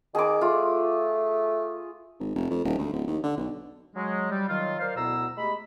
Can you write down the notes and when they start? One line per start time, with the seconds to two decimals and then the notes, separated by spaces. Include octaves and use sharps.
0.15 D#3 G#4 D6
0.41 A3 F4
2.20 G#1
2.35 F1
2.51 F2
2.64 D#1
2.78 D2
2.93 D1
3.07 D#2
3.23 D3
3.37 B1
3.96 F#3 G#3
4.31 G3
4.48 D#3 F#3 F4
4.80 A#4 C5 D5 F5
4.97 D2 B2 B3 E4 A#5 E6
5.37 G#3 A3 G4 B5